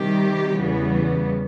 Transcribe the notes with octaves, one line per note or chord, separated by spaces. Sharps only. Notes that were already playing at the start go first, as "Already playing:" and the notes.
Already playing: C3 D#3 G3 G4
E2 C#3 E3 G3 B3